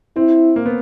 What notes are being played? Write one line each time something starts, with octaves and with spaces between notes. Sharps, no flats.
C4 E4
A#3
B3